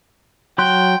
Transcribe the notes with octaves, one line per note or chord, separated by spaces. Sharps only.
F#3 G5 C6 F#6